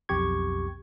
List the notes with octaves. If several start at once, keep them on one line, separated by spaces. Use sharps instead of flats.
B1 F2 G4 C#6 G#6